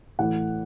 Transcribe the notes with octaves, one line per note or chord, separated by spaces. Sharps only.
A2 E3 A3 F#5